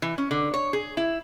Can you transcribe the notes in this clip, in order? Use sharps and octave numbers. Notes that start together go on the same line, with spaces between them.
E3
C#4
D3
C#5
G#4
E4